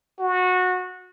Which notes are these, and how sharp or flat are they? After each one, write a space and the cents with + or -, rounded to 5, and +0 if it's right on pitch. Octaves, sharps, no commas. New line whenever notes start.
F#4 -20